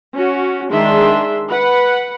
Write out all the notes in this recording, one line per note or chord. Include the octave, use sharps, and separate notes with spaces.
C#4 F#4
D#3 G#3 D4 G#4 E5 C6
B4 F#5